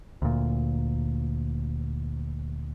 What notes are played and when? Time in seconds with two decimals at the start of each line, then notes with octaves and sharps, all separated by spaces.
0.22 D2 A#2